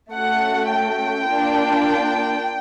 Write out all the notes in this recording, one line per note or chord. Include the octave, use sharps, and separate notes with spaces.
A3 C#4 F#4 F#5
G5
A#3 D4 F4